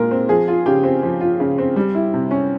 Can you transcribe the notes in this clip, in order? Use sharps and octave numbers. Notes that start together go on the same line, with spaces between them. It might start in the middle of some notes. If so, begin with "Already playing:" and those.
Already playing: A#2 G#3 F4 A#4
C4
F3 G#4
F4
C#3 G4
C4
F3
F4
C#3
C4
G3
E4
C3
C#4